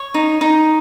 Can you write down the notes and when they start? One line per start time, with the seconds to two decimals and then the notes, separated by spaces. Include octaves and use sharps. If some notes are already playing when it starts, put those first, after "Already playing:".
Already playing: C#5
0.14 D#4
0.41 D#4